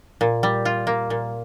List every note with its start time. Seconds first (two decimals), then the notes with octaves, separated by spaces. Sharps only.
0.21 A#2
0.43 G3
0.65 F4
0.87 A#3
1.10 A#2